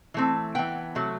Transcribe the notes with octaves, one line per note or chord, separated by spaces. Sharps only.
E3 A3 C4
E3 B3 G5
C3 F#3 A3